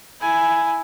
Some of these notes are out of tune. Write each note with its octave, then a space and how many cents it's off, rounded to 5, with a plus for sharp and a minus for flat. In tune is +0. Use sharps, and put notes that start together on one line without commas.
E4 +0 G#5 +0